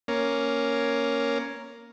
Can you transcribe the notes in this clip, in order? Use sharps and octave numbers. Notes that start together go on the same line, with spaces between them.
A#3 C#4